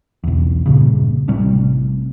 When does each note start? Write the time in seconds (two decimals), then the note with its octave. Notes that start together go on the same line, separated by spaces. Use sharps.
0.24 B1 E2
0.66 G2 A#2 C#3
1.28 A1 A2 C3 G3